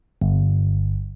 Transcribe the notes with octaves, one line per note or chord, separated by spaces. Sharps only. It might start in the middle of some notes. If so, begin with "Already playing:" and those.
G1